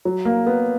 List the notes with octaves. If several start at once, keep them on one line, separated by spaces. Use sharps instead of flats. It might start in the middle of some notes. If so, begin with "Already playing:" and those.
F#3
A#3
B3